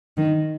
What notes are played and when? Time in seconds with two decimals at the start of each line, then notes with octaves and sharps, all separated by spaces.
0.17 D#3